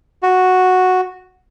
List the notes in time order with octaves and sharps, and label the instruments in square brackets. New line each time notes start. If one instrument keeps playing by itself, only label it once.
[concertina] F#4